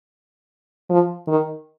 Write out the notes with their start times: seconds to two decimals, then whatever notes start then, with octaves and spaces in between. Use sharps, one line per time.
0.90 F3
1.28 D#3